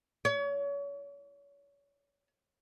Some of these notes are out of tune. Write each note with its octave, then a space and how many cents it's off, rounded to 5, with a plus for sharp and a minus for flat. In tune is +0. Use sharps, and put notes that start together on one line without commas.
C#5 +35